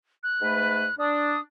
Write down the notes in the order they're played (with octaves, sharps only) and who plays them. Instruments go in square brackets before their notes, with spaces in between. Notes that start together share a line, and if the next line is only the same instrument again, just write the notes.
[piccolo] F#6
[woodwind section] G#2 A3 B4
[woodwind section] D4 [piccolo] D#6